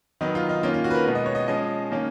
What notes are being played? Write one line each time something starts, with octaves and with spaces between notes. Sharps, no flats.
D#3 F#3 B3 D#4
F4
D#4
D#3 A#3 C#4 F4
F4
F#4
B4
A#4
B2 G#3 B3
D#5
C#5
D#5
F3 G#3 C#4 D#5
D#3 A#3 C#4